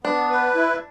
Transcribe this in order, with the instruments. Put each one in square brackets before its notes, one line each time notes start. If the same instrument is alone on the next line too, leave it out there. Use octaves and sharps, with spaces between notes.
[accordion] B3 [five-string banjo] D4
[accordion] B4
E4